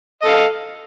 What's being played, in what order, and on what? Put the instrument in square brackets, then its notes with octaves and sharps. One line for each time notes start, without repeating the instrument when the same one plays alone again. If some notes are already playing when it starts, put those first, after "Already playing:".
[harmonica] D#5
A4
F5